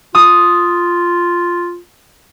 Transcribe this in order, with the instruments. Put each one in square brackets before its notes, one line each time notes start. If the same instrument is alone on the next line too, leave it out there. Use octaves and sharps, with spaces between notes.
[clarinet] F4 [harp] D#6